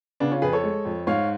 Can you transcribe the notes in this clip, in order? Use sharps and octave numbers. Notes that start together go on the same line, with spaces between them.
C#3 B3 D4
C#4 F4
F2 G#4 B4
A4 C#5
G#3
F2
G#2 C#5 F5